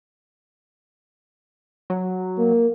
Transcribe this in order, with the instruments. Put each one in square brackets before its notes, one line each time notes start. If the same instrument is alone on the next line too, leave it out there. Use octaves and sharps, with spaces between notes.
[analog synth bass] F#3
[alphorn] A#3